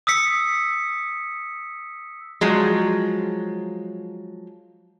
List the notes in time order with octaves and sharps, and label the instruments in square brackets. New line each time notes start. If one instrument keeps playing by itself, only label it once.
[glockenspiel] D#6 E6 B6 C#7
[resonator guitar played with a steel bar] F3 F#3 G#3